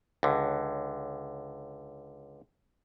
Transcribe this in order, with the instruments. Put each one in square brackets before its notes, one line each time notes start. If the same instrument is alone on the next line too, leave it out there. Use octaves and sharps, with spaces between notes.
[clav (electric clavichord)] C#2 D3